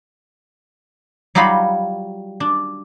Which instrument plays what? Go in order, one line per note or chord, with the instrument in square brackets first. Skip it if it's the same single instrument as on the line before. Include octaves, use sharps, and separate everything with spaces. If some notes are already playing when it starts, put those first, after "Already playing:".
[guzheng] F#3 G3 D#4 F4 F5 B5
D4